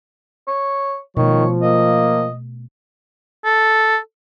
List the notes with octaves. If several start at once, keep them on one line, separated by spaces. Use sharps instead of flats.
C#5
B2 D#3 F3 A3 C#5
A#3 D#5
A4